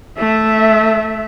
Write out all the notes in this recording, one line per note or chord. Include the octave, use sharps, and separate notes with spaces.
A3 E5